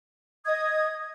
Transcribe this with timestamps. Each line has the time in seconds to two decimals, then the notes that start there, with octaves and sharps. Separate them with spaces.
0.45 D#5 D#6 G#6